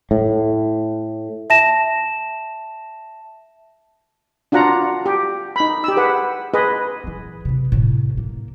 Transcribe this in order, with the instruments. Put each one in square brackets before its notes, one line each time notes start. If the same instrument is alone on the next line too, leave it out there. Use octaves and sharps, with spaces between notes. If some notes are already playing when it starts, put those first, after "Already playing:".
[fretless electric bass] A2
[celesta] E5 A5 A#6 E7
[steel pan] D4 F4 F#4 F#5 A#5
G4
D#4 B5
G4 E6
G#4 B4 F#5
G#4 B4 D#5
[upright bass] A#2 E3
C3 E3
A2 C3
A#3